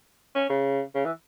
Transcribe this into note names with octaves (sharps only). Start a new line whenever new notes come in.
C#4
C#3
C#3
E3